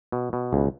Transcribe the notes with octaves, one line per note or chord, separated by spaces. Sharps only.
B2
B2
C#2